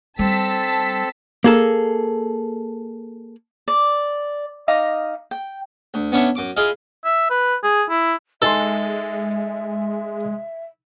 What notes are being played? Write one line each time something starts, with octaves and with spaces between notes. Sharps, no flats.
G3 C4 A4 A5 B6
A#3 G#4 A4
D5
D#4 D#5 F5 D6
G5
D2
B3 C#4 D4 C#5 E5
F#2 D6
E4 F4 G#4 D#5 F5
E5
B4
G#4
E4
G#3 D#4 A4 E5 G#5 C6